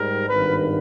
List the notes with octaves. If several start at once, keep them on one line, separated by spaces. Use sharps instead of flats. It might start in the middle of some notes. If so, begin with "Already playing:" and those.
Already playing: G#2 G3 A#4
G#1 G2 D#3 B4